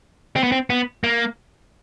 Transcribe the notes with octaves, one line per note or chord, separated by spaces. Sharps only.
C4
B3
C4
B3
A#3